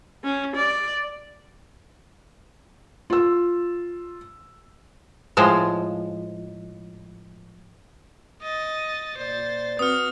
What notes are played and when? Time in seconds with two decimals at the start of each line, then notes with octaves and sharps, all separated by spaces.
0.24 C#4
0.55 D5
3.10 F4 E6
5.37 A2 F3 G#3
8.42 D#5 A6
9.17 A#2 C5 D5 A6
9.79 C4 F#4 B4 D#6 F6